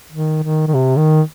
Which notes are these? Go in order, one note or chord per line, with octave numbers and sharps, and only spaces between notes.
D#3
D#3
D#3
C3
D#3